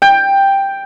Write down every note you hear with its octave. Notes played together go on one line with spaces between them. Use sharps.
G5